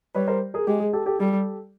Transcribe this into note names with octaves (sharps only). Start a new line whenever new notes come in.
G3 B4 C#5
A#4 C5
G#4 A#4
G#3 G4
G#4
G4 A4
G4 A4
G3 G4 A4